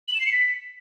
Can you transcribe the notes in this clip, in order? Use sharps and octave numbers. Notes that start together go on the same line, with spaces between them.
F#7
E7
C7
C#7
B6